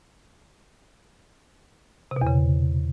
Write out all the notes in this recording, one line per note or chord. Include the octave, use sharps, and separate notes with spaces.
C3
B2
E2
C#3